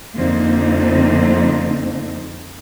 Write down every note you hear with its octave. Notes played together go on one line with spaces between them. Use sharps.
F2 D3 A#3 C4 D#4